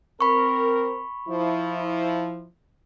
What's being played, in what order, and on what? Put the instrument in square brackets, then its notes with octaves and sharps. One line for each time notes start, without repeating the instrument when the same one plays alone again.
[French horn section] C4 A#4 [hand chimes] B5 C#6
[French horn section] F3 E4